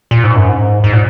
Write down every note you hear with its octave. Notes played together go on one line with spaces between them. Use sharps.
A#2
G#2
F#2
G#2
G#2
A#2